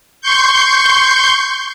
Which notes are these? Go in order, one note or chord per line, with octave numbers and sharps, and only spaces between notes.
C6 C#6 G6